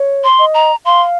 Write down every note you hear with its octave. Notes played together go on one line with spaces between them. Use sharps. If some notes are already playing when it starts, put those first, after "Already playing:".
Already playing: C#5
C6
D#5
A#5
F5 C6